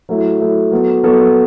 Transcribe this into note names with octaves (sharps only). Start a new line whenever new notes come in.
F#3 A3 E4
F#3 A3 E4
F#3 B3 F#4 A4
F#3 B3 F#4 A4